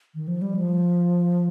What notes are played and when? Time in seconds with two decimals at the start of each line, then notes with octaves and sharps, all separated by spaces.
0.15 D#3
0.28 F3
0.42 G3
0.56 F3